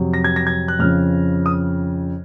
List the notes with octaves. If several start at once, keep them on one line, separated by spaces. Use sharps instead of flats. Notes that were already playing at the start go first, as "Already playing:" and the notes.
Already playing: F2 C3 F#3
A#6
G#6
A#6
G#6
F#6
F2 C#3 F3 F6
D#6